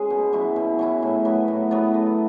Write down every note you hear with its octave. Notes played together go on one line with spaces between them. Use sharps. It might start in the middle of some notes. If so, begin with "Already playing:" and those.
Already playing: G#3 C#4 G#4
B2
F#3 C#4 E4
B2
F#3 C#4 E4
A2
F#3 B3
A2
F#3 B3
A3